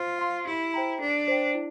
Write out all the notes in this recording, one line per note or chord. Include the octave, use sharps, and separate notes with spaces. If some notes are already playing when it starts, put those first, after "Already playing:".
Already playing: F4 C5
F5 C6
E4 G4
C5 G5 A#5
D4 A4
C5 G5
E4